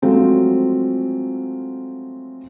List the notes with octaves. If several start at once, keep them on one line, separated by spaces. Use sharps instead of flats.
F3 F#3 G#3 A3 C4 F4